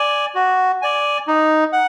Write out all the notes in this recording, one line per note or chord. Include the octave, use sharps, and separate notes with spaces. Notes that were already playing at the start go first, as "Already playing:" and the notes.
Already playing: D5 G#5
F#4
D5 G#5
D#4
F#5